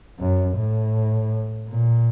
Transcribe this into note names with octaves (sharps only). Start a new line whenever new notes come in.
F#2
A2
A#2